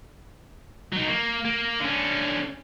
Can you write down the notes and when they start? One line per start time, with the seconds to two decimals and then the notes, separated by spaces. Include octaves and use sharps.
0.93 F#3 D#4
1.08 A#3
1.45 A#3
1.80 D3 C#4